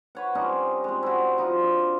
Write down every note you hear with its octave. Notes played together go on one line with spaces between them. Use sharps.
B4 C#5 F#5
G3 C4 C#4 D#4
G#3 C4
E4 F#4
F3 D#4 F4
D4